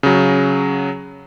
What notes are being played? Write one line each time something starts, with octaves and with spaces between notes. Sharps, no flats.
C#3 F#3